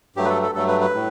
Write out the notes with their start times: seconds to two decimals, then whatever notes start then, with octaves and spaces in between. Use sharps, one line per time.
0.16 G2 F#3 A3 G4
0.25 B4
0.29 A4
0.42 A4
0.55 G2 F#3 A3 A4
0.68 B4
0.81 B4
0.94 A2